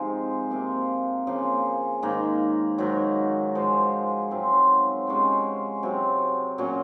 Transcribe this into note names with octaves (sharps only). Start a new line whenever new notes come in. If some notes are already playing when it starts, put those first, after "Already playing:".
Already playing: C3 F3 G#3 D#4
C3 F3 A#3
C#3 F3 A#3
G#2 D#3 A#3
G#2 D#3 F#3
G#2 F3 G#3
G#2 F#3 C4 F4
C3 F3 G#3 C#4
C3 F#3 C4
A#2 F#3 C#4